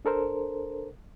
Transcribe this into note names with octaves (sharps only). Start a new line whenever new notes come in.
D4 A4 A#4 C5